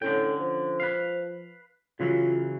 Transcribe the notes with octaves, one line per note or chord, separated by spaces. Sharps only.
A2 D3 C#4 G5
F3
B4 F5
C#3 E3 F#3 F4